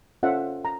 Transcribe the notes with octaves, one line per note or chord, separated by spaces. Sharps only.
C#4 F4 A4 C5 E5 F#5
A#5